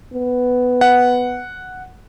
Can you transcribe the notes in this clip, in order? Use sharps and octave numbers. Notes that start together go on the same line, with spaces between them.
B3
F#5